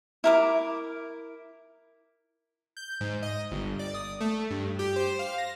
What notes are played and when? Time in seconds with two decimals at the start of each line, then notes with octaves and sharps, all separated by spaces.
0.24 E4 A#4 D6
2.77 G6
3.01 G#2
3.23 D#5
3.51 G1
3.79 D5
3.94 D#6
4.21 A3
4.50 G2
4.79 G4
4.96 C5
5.19 F5
5.38 A#6